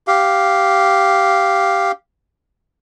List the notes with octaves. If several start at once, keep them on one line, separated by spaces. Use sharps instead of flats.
G4 F5